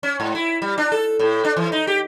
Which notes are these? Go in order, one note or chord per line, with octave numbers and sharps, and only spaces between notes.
C#4
G#2
E4
G3
D4
A4
A2
D4
E3
D#4
G4